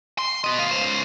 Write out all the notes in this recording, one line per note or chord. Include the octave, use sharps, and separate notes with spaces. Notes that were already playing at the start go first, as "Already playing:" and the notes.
C6
B3 D#5
D2 F5
C#2 C5